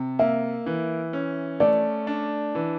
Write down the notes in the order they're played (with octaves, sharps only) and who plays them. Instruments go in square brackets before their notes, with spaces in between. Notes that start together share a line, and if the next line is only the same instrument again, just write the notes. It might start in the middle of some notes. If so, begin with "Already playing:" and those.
Already playing: [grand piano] C3
[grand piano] A#3 [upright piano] E5
[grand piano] E3
C#4
[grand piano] A3 [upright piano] D5
[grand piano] D4
E3